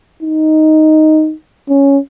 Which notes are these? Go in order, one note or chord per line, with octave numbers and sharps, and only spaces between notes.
D#4
C#4